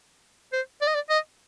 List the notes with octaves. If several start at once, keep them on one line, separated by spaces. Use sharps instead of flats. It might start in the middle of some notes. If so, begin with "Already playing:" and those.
C5
D5
D#5
D5
D#5